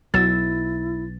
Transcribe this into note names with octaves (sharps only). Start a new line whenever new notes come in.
B1 F#3 E4 E6 A6